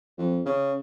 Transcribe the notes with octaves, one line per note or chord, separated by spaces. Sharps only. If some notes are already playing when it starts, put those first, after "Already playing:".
F2
C#3